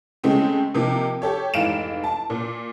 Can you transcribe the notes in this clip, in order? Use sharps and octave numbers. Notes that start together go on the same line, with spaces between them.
C#3 G#3 A3 C4 C#4
C3 F3 A#3 D#4
G4 A4 C#5
F1 G#2 E3 F5 D7 E7
A5
A#2